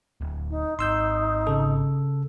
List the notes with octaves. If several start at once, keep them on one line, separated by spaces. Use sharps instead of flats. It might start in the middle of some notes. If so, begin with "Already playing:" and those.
D1
D#4
G#1 D#4 C6 E6 G6
C#3 A4